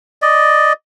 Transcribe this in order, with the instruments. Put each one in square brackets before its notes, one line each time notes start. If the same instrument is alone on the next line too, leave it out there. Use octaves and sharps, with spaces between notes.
[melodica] D5 D#5